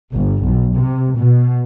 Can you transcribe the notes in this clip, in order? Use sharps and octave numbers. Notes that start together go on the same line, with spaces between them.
G1
B1
C3
B2